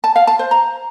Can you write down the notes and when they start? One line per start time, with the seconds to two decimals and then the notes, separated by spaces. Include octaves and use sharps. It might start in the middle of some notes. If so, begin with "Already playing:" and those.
0.04 A5
0.16 F5
0.27 A5
0.39 C5
0.51 A#5